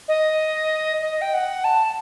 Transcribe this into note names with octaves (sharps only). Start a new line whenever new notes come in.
D#5
D#5
G5
F#5
A5